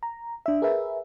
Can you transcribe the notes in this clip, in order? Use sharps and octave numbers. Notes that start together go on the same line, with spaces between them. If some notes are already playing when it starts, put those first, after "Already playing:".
A#5
D4 E5
G#4 A#4 B4 E5